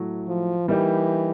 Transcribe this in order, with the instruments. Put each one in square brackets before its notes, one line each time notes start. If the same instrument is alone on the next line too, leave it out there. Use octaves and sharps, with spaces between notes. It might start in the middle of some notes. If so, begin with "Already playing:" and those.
Already playing: [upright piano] A2 F#3 A3
[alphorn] F3
[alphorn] E3 [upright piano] G3 A#3 D#4 G4